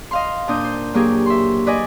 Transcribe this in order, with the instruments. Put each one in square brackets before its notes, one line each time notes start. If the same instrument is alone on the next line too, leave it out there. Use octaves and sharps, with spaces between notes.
[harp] D#5 F5 C6
A#2 D4 D#6 G6
C5
F#3 A#3 G4 G#4
E5 C6
B4 D5 D#5 G#5